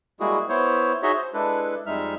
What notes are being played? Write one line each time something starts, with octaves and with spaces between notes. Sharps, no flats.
G3 G#3 A#3 E4 F#4 G#4
B3 E4 C5 C#5
D#4 F#4 G#4 C#5 D#5 E5
C5
G#3 D4 E4 A4 B4
F2 G3 G#3 D#4 E5 F6